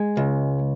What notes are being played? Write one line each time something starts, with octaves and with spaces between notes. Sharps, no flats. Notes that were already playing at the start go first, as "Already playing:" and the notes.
Already playing: G#3
C#2